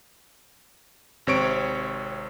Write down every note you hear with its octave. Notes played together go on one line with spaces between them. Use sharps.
G#1 C3 C4 C#5 C#6 D7